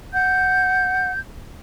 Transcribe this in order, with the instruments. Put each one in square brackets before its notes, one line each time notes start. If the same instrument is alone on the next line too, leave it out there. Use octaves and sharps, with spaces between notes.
[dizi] F#5 [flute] G6